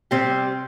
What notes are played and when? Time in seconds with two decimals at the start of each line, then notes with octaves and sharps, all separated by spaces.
0.11 C3 G3 C4 G4